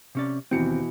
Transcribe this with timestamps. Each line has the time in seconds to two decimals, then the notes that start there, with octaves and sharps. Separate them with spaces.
0.15 C3 C#4 D5
0.51 D#2 B2 E3 C4 C#7